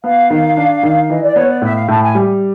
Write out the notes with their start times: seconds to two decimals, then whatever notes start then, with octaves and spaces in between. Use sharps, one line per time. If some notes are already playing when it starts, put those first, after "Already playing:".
0.04 B3 F5
0.30 D#3
0.57 D4
0.83 D#3
1.09 E3 D#5
1.22 D5
1.36 B3 C#5
1.49 D5
1.62 A2 E5
1.75 F5
1.88 A2 A5
2.02 G#5
2.15 G3